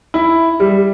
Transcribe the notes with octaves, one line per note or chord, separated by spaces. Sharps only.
E4
G3